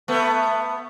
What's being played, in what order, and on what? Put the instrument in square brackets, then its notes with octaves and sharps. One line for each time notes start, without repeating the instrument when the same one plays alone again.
[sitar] A3 B3